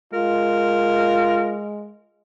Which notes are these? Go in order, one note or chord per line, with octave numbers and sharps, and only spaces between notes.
G#3 F4 A#4